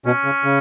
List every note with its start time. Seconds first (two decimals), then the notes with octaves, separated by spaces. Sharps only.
0.06 B2 C#4
0.25 C#3
0.44 C#3